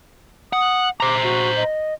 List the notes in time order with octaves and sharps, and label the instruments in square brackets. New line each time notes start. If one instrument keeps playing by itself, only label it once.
[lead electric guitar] F#5 [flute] D#6
[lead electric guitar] C5 A#5 [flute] D6
[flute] F#4
D#5